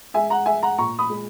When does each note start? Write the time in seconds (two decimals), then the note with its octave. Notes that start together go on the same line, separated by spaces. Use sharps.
0.14 G#3 E5 G#5
0.30 F#5 A#5
0.46 G#3 E5 G#5
0.63 F#5 A#5
0.78 A#2 A#5 C#6
0.99 B5 D#6
1.10 G#3